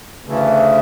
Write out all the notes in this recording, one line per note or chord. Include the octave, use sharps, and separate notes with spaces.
D2 C#3 E3 A3